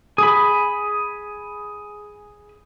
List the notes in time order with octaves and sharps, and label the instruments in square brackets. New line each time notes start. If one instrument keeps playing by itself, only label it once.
[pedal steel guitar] G#4 B5